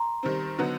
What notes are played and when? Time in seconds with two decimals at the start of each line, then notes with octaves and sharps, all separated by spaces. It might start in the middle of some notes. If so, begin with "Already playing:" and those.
Already playing: A#5 C6
0.23 D#3 G3 C4
0.58 D3 F#3 B3 D#4